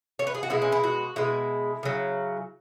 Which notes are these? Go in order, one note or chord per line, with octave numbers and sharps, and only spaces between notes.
C#5
B4
G#4
F#4
B2 G#3 E4
C#4
E4
F#4
B2 G#3 E4
C#3 F#3